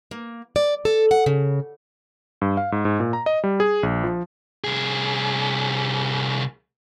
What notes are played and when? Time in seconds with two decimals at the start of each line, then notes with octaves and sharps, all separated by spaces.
0.11 A#3
0.56 D5
0.85 A4
1.11 F#5
1.26 C#3
2.41 G2
2.57 F5
2.72 G#2
2.85 G#2
3.00 A#2
3.13 A#5
3.26 D#5
3.44 G3
3.60 G#4
3.83 A#1
4.04 F3
4.64 C2 G#4